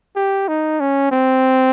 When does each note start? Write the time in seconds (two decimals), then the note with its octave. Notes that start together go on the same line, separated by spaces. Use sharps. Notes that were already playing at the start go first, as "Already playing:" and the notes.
0.16 G4
0.48 D#4
0.80 C#4
1.12 C4